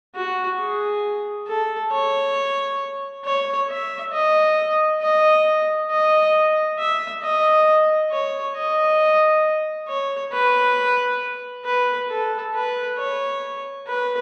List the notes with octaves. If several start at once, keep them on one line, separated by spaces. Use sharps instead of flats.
F#4
G#4
A4
C#5
C#5
E5
D#5
D#5
D#5
E5
D#5
C#5
D#5
C#5
B4
B4
A4
B4
C#5
B4